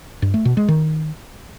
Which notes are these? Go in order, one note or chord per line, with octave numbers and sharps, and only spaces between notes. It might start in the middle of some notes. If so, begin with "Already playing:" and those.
G2
A3
B2
G#3
D#3